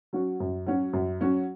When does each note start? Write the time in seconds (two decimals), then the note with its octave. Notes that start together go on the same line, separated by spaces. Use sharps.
0.13 F#3 C#4 F#4
0.40 F#2
0.66 F#3 C#4 F#4
0.93 F#2
1.21 F#3 C#4 F#4